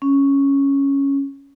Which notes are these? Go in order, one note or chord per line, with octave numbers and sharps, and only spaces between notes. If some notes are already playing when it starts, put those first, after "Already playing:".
C#4